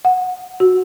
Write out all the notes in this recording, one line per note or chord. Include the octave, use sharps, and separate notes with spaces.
F#5
F#4